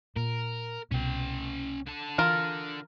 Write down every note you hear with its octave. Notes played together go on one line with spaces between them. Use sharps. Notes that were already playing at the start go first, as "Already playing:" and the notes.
A#2 A#4
C2 B2 C#4 G5
D3 A5
E3 F4 A#4